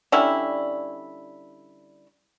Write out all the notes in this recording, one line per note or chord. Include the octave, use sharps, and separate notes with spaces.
D3 G3 C#4 E4